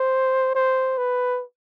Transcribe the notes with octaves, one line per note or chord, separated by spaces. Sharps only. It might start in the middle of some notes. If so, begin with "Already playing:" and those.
Already playing: C5
C5
B4